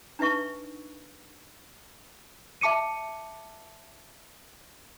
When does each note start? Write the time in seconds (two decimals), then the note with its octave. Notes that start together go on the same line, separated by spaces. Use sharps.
0.19 D4 D#4 B4 E5 C#6
2.61 E5 A5 D6 C#7 D#7